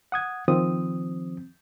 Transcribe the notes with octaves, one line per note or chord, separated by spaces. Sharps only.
F#5 D#6 G#6
D#3 F3 C4 D#6